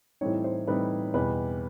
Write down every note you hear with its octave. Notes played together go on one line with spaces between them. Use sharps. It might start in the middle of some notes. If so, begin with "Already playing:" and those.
A2 E3 G3 C4 D#4 C#5
C5
A2 E3 G3 C4 D#4 B4
E2 B2 G3 B4